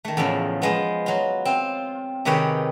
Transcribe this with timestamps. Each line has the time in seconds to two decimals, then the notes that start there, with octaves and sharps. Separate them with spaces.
0.05 D#3 A3
0.17 E2 A2 C#3 F3
0.62 F3 G#3 B3
1.06 F#3 F4
1.45 C4 F4
2.25 C3 D#3 G#4 B4 C#5 G5